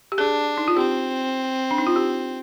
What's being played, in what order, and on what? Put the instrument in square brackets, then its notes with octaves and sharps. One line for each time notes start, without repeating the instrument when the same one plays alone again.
[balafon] G4
[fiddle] D4 [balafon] G#4
[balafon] D#4
F4
[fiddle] C4 [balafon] G4
[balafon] D4
D#4
F4
G4